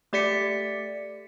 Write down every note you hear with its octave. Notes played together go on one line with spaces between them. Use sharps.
A3 G4 D5 B6 C#7